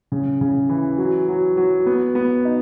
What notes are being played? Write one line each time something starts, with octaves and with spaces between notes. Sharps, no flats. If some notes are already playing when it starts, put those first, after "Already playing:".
C#3
C#3
E3
F#3
F#3
F#3
B3
B3
D#4